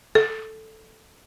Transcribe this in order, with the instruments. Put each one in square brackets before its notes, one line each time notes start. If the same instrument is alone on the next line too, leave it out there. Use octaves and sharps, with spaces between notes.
[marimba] A4